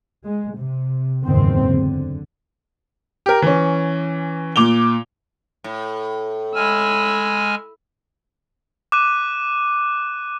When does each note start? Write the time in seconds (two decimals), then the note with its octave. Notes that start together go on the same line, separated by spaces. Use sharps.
0.24 G#3
0.56 C3
1.28 F#1 E2 G#2 D#3 C4
1.69 D3
3.26 G4 A#4
3.42 E3 C#4
4.56 A#2 D6 F7 G7
5.64 A2
6.55 G#3 G#5 B5 E6 F6
8.92 D6 F#6 D#7